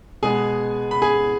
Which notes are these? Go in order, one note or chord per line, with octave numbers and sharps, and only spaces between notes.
B2 G#3 B3 G#4 G#5
B5
G#4 G#5